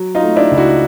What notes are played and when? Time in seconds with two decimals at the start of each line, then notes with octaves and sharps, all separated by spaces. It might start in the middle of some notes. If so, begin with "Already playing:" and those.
Already playing: F#3
0.15 D#4 F4
0.23 A3
0.36 D4 E4
0.52 C#2
0.58 E4 F#4